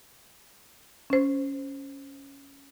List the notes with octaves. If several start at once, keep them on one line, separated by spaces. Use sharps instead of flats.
C#4 C5